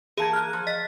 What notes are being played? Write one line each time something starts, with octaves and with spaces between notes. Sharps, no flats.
E3 A#3 G#4 A5 G#6
F6 F#6
F3
D#5 A6 B6